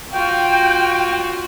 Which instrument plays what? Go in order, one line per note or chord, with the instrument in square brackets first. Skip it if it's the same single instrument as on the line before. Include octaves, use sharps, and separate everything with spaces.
[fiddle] F4 F#4 [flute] G5